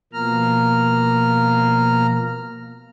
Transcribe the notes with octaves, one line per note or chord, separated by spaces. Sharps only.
B2 F3 A#3 A#5 F6